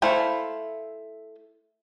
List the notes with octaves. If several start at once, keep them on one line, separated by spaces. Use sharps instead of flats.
A3 E4 C5 F5 B5